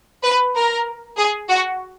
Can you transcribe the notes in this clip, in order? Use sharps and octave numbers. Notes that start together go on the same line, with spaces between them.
B4
A#4
G#4
F#4